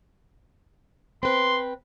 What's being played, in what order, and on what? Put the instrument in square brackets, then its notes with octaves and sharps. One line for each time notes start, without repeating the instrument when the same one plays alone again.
[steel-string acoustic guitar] C4 B4 [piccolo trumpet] C6